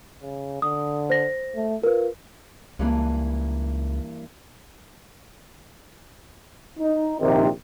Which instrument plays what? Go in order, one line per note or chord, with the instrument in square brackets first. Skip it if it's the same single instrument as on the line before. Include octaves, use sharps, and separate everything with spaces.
[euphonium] C#3
[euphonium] D3 [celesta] D#6
[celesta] C5 A#6
[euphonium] A3
[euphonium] F4 [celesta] A#4 B4
[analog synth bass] C#2 [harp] G2 E3 A#3
[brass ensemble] D#4
A#1 C3 D#3